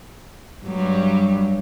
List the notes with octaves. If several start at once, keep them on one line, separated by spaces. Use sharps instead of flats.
G2 F#3 G3